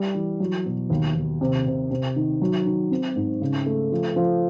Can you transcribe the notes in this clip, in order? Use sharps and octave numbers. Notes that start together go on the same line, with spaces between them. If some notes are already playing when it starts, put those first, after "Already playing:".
Already playing: G3
E3
F#3
B2
D#2
D#2
C3
C3
C3
D#3
F#3
D#3
C4
G#2
C#3
A3
F3
F3